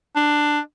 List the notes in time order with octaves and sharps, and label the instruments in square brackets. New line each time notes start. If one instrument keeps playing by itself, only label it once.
[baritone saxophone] D4